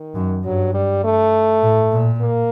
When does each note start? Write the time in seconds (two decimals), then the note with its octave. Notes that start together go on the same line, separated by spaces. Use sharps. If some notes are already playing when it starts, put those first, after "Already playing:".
Already playing: D#3
0.15 F#2
0.44 G2 F#3
0.74 G3
1.04 A3
1.63 A2
1.92 A#2
2.21 A#3